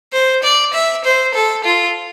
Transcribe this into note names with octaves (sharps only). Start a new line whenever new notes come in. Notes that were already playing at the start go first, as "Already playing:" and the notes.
C5
D5
E5
C5
A4
F4